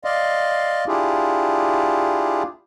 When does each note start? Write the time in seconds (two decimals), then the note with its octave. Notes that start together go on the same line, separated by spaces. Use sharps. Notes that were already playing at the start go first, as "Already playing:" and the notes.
0.05 D5 D#5 F5 C6
0.88 D4 E4 F4 G4 G#4